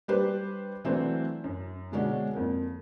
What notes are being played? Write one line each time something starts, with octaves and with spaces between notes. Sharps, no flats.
G3 D4 G4 B4 C5
E3 F#3 A3 C4 D4 C5
F#2
B2 D3 G#3 C#4 D4 F#4
F2 A#3